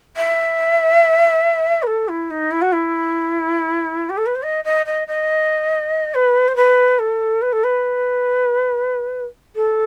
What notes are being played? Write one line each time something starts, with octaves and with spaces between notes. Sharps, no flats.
E5
B4
A4
E4
D#4
E4
F#4
E4
G4
A4
B4
C5
D#5
D#5
D#5
D#5
B4
C5
B4
A4
B4
A4
B4
A4